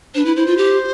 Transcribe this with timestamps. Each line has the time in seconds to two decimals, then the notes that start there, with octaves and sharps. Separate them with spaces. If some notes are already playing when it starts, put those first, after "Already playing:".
0.14 D4 B4 C5
0.26 E4
0.36 E4 C5
0.47 F4
0.58 G4